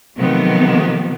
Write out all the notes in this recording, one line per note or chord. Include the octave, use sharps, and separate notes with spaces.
C3 D#3 F3 F#3 A3 B3